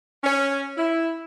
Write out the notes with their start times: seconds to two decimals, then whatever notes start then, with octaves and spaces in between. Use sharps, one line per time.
0.24 C#4
0.77 E4